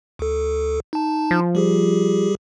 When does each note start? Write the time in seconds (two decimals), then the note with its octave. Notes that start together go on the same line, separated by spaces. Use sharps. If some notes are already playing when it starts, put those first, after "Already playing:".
0.19 D2 A4
0.93 D#4 A5
1.31 F3
1.55 G3 G4 G#4